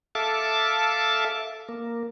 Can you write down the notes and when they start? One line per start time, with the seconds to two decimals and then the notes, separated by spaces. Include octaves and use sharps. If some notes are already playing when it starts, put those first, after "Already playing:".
0.15 A4 E5 F5 A5 D6
1.69 A#3